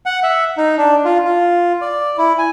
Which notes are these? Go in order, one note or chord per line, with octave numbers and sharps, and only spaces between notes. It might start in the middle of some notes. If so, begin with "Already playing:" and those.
F#5
E5
D#4
D4
F4
F4
D5
E4
G#5